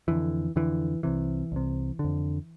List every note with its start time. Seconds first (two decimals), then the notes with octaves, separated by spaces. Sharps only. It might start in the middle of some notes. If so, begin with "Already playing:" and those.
0.08 F2 D3 E3
0.56 F2 D3 E3
1.03 C2 C3 E3
1.52 C2 C3
1.99 D3
2.04 F2